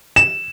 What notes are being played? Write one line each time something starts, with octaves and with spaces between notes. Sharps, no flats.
E7